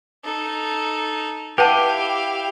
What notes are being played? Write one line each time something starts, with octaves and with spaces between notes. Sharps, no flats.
D#4 A4
E4 G4 B4 F5 F#5 A5